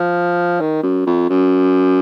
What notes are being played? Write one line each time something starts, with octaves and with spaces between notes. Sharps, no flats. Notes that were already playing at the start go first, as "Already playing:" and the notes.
Already playing: F3
D#3
F#2
F2
F#2